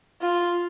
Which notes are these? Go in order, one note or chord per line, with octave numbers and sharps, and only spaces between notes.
F4